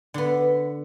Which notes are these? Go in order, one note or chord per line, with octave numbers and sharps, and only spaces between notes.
D3 B3